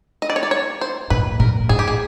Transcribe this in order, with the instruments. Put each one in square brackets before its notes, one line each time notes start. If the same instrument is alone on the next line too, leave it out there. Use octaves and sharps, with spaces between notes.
[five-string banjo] D#5
D5
C#5
D5
C#5
C5
[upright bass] A#2 [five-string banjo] B4
[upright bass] A#2 [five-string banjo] A#4
[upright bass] A2 [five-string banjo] G#4
[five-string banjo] G4
G#4